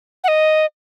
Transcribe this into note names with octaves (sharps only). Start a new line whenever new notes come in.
F#5
D#5